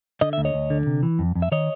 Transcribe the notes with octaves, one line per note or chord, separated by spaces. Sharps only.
D3 D#5
D2 E5
C#5 D#5
D2
D3
C3
E3
F2
F2
E5
D#3 C#5 D#5